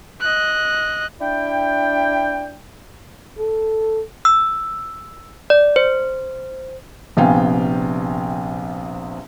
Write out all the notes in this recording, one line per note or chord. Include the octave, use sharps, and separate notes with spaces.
D#5 F#6
D4 E4 G5
A4
E6
D5
C5
A#1 C3 B3 F5 G5 G#5